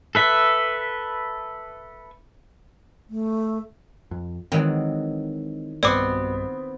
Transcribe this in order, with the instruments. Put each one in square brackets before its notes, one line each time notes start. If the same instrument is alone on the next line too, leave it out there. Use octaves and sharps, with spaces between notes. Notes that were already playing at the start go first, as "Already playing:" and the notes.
[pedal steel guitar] A4 B4 E5
[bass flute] A3
[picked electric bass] F2
[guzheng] D#3 E3 F#3 [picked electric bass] G#3 C4
[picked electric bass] B1 G2 B2 [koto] B3 C4 [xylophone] D5 D6